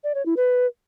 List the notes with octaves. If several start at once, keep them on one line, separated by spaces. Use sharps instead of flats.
D5
C#5
E4
B4